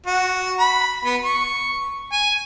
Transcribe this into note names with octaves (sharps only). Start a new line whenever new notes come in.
F#4
B5
B3
C#6
G#5